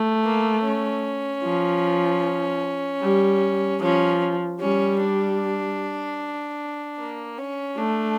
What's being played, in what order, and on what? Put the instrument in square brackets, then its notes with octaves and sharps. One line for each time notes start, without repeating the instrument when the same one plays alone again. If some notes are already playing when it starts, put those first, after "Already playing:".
Already playing: [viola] A3
[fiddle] A#3
C#4
[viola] F3
G3
[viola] F3 [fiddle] C#4
[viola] G3 [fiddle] C#4
[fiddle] D4
A#3
C#4
[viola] A3 [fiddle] D4